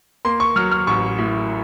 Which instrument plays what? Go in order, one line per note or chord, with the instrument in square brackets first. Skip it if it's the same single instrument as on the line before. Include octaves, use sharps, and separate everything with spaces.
[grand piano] A#3 C6
C#6
F#3 F6
F6
A1 C#6
A2